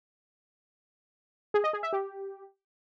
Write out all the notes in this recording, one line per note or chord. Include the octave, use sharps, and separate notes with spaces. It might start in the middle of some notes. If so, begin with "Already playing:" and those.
G#4
D#5
G#4
E5
G4